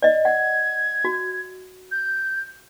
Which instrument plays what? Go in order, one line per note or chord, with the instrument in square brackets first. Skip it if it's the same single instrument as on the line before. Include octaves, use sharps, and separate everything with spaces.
[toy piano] D5 D#5
[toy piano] F#5 [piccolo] G#6
[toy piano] F#4
[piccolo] G6